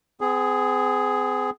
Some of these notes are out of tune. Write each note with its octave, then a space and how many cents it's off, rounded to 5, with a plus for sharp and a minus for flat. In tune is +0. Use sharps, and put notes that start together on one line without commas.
C4 -45 G#4 +0